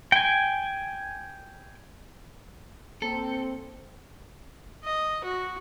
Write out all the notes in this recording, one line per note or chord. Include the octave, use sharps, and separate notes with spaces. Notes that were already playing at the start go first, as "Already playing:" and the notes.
G5 G#5
A#3 C4 A4
D#5
F#4